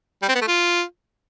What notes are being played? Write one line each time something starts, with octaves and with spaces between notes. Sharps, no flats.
G3
C4
B3
A3
F4